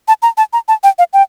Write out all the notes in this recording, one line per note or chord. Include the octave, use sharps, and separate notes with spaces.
A5
A#5
A5
A#5
A5
G5
F5
G5